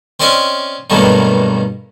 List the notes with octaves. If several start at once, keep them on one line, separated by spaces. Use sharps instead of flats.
C4 C#4 D5 D#5 F5 G#5
G2 B2 D#3 F#3 A3 A#3